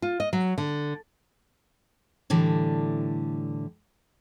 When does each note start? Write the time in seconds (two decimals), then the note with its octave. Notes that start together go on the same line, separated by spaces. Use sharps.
0.02 F4
0.20 D#5
0.33 F#3
0.58 D3
2.30 A2 D3 E3 G3